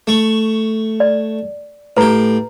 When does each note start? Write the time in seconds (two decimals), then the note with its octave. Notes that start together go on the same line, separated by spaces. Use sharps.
0.07 A3 C#6
1.00 D5
1.97 A2 G4 B4 A#5